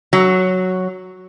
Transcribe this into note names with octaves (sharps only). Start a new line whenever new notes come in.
F#3